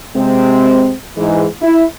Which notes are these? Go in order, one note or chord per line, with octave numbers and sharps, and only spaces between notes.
C3 G#3 C4
G#2 E3 G#3
E4